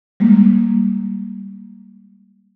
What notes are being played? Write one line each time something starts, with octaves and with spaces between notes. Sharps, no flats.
G3 G#3 A#3